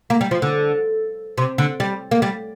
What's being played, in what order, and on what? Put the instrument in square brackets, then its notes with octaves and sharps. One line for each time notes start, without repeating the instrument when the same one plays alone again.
[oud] A#3
G3
F3
D3
C3
D3
G3
A#3
G3